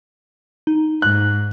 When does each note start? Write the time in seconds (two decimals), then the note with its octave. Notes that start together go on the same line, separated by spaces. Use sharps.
0.67 D#4
1.02 G#2 F#6